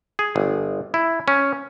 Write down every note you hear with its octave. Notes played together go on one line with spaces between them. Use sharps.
G#4
G1
E4
C#4